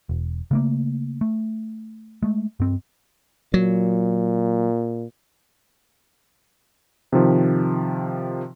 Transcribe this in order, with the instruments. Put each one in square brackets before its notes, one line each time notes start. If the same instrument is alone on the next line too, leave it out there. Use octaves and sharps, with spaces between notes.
[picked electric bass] E1
C#3 A3 A#3
A3
G#3 A3
G2 C4
[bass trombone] A#2 [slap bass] F#3
[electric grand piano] C3 D#3 F3